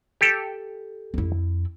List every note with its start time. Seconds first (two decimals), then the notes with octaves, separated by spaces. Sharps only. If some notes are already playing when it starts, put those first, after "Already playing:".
0.21 G4 A4
1.14 F2 E4